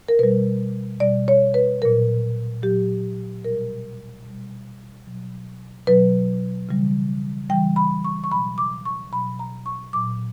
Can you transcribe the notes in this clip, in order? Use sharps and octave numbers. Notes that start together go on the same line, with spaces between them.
A#4
B2 G3 B4
B2 G3 D5
C#5
B4
A#2 F#3 A#4
A#2 F#3 G4
B2 G3 A#4
B2 G3
B2 F#3
B2 F#3 B4
C#3 E3 G3
C#3 E3 G3 G5
B5
C#6
C#6
B2 F#3 B5
D6
C#6
B2 F#3 B5
A#5
C#6
A#2 F#3 D6